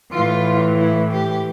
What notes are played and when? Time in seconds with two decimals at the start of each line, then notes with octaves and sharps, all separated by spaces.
0.12 A2 E3 F4
0.78 E4
1.12 G4